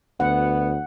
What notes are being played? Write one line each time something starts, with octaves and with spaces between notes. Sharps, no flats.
D2 B3 F#5